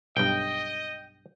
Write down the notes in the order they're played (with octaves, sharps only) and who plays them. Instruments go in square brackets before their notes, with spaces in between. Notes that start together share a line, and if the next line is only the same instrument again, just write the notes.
[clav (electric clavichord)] B1 G2 [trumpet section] D#5 [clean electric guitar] G5